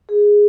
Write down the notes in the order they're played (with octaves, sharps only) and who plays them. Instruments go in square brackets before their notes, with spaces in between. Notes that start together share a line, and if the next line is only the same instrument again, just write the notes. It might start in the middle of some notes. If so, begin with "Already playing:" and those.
[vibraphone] G#4